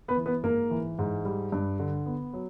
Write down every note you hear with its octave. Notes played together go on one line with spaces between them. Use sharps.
B3 B4
E3
B3 B4
G#2 A#3 A#4
E3
G#2
G3
G2
D3
B3
F#3